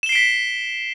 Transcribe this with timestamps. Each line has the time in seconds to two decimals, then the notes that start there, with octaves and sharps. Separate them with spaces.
0.03 E7
0.06 G7
0.09 C7
0.12 D7
0.15 B6